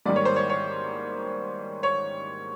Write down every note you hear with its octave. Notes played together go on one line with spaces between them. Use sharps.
G#2 D#3 G3 A#3 D5
C#5
C5
C#5
C#5
C#5